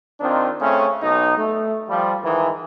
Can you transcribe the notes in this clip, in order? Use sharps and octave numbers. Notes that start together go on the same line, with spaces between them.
D#3 C4 D4 D#4 F4
C#3 A3 C4 C#4
B1 D#4
A3
F3 G3
G#2 D#3 E3